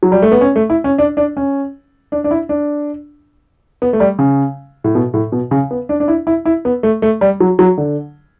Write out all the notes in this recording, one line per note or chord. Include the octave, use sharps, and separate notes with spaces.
F#3
G3
A3
B3
C#4
A3
E4
C#4
D4
D4
C#4
D4
D4
E4
D4
B3
A3
G3
C#3
A2
B2
A2
B2
C#3
B3
D4
D4
E4
E4
E4
B3
A3
A3
G3
F#3
F#3
D3